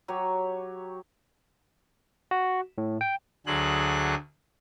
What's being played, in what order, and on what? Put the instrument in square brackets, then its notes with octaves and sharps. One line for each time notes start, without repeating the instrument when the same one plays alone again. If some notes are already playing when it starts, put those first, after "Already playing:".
[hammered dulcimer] F#3 G4 C#5
[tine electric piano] F#4
A2
G5
[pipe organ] D2 D3 F#3 G#4 F#6